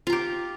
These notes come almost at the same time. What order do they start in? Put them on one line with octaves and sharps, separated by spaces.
F4 A#5 G4